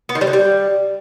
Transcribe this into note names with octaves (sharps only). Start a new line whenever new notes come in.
B3
D#3
G3
D3
G3